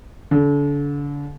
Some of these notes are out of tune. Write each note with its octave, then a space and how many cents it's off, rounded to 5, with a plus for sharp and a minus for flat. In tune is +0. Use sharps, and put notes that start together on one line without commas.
D3 -35